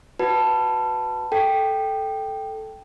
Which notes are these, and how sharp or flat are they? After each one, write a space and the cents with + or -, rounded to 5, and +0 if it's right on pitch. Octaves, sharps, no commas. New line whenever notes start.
F#4 +0 B4 +5 A5 +0
A4 -5 G5 +0